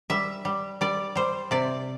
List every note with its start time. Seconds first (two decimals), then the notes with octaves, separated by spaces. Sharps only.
0.10 G3 E5
0.45 G3
0.81 G3 D5
1.15 G3 C5
1.51 C3 D5